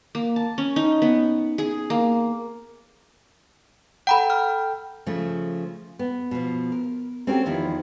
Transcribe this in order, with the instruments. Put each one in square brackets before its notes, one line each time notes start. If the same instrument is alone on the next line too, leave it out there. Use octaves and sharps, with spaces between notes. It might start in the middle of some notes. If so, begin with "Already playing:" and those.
[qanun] A#3
A5
C#4
D#4
B3
G#4
A#3
[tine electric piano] A4 G5 [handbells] F#5 A#5 B5
[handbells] F6
[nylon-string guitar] C#3 F3 A3
B3
B2 F3
A#4
C4 C#4 F#4 G4 A4 A#4
E2 D#3 F3 E4